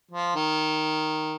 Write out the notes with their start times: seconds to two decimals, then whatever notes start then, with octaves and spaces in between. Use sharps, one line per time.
0.11 F3
0.35 D#3